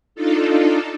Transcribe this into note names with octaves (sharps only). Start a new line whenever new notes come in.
D4 D#4 F4 A4